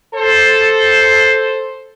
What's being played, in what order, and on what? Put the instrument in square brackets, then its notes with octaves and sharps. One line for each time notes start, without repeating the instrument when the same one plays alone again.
[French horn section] A4 C5